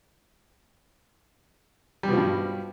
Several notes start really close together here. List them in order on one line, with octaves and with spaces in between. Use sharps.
G3 B2 F3 G2